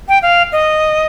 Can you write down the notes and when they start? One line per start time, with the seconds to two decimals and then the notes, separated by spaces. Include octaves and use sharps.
0.08 G5
0.22 F5
0.52 D#5